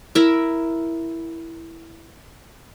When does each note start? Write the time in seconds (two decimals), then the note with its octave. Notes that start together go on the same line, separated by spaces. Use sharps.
0.15 E4 A#4 E5